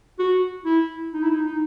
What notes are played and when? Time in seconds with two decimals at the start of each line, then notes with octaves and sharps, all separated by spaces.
0.19 F#4
0.65 E4
1.14 D#4
1.23 E4
1.31 D#4
1.45 D#4